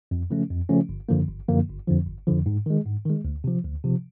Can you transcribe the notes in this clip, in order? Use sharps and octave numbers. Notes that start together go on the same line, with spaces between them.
F2
C#3 F3 A3 C#4
F2
C#3 F3 A3 C#4
G1
F#2 D3 F3 A#3
G1
F#2 D3 F3 A#3
G1
F2 D3 F3
G1
F2 D3 F3
G#2
D#3 G#3
G#2
D#3 G#3
D2
C3 F3
D2
C3 F3